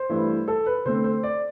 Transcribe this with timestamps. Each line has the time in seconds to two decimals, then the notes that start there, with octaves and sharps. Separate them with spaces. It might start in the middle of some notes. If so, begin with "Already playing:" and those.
Already playing: C5
0.09 G2 E3 A3 E4
0.48 A4
0.66 B4
0.85 D3 A3 C4 C5
1.04 C5
1.23 D5